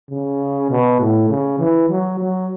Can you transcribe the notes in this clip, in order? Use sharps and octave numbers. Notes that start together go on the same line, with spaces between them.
C#3
B2
A2
C#3
E3
F#3
F#3